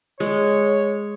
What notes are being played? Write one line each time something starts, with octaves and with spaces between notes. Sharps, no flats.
G#3 C#5